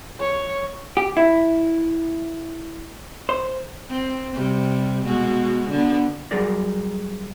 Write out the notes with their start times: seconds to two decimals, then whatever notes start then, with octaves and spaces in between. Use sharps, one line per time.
0.20 C#5
0.97 G4
1.17 E4
3.29 C5
3.89 C4
4.35 C3 G3
5.05 B2 G#3 F#4
5.69 D3 B3
6.31 F#3 G3 G#4 A#4 D5